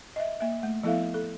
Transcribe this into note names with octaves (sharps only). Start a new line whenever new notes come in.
D#5 E5
A#3 E5
A3
F3 B3 E4 A4 E5 F5
A4